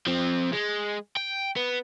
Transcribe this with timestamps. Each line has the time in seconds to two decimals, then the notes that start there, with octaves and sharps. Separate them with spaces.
0.07 F3 C4
0.53 G#3
1.17 G5
1.56 B3